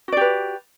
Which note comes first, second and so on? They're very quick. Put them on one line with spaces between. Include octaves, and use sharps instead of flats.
F#4 D5 G4 B4